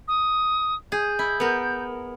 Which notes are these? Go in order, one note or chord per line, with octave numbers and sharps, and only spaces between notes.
D#6
G#4 G6
E4
B3 A#4